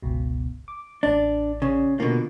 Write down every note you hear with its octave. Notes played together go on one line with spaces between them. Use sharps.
G1 C#2 B2
D6
A1 D4 D5
C#3
B2 D3 A#3 F4